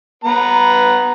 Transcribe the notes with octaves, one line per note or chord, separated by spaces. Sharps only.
B3 B4 A#5